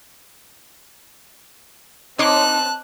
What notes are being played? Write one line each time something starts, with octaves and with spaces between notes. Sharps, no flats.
C4 D#4 C#5 A5 C6 D6 F#6